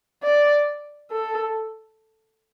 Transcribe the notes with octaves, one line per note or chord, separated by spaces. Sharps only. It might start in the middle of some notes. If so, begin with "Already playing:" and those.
D5
A4